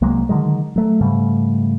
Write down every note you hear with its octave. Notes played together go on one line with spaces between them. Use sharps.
C2 F#3 G#3 A#3
D3 D#3 F#3 G#3
F#3 A3
G#2 C#3 G3 A3